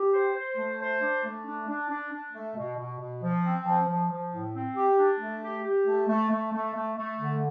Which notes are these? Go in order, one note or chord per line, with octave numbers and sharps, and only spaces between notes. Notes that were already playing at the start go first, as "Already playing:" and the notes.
Already playing: G4
C5
C5
A3
C5
D4
A3
D4
D4
D4
D4
A3
B2
B2
B2
F3
C4
F3
F3
F3
A2
C4
G4
D4
A3
G4
G4
A3
A3
A3
A3
A3
A3
D3